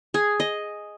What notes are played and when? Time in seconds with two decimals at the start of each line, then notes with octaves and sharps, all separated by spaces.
0.14 G#4
0.40 D#5